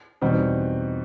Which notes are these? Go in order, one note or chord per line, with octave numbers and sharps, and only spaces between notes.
E2 B2 G3 C4 D#4